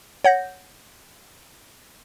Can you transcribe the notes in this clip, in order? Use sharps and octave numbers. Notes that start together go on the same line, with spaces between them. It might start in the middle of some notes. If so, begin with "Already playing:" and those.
C#5 F#5 G6 A#6